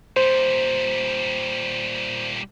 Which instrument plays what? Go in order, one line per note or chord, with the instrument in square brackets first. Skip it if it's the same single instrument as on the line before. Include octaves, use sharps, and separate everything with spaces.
[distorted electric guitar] A#2 G3 [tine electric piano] C5